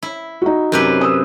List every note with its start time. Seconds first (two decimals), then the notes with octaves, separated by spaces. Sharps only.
0.03 E4
0.42 D#4 F#4
0.72 F#2 C3 B4
1.01 D#6 E6